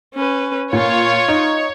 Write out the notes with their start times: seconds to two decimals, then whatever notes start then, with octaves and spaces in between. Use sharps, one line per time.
0.15 C#4 B4
0.73 A#2 F4 C#5
1.28 D#4